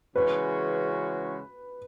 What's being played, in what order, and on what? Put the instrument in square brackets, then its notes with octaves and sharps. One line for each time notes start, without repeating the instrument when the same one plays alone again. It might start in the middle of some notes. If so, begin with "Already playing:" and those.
[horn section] C#3 E3 G#3 C#4 F#4 [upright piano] B4